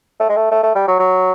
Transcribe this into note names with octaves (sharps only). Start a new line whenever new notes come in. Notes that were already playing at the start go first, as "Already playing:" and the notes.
A3
G#3
A3
A3
A3
G3
F#3
F#3